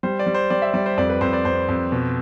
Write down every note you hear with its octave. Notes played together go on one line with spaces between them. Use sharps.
G3 C5
D5
G3
C5
G3 D5
E5
G3 D5
C5
F2 D5
B4
F2 C5
D5
F2 C5
F2
B2